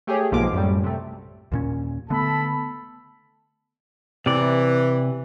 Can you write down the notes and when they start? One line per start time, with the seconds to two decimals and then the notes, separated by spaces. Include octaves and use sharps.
0.07 A3 G4 G#4 C#5
0.31 B1 G#2 F3 A#3 F4 D6
0.53 F#2 A2 G3
0.84 C3 A3
1.52 D#2 A#2 C#4
2.10 D3 A3 B3 A4 A5 B5
4.26 C3 E3 D5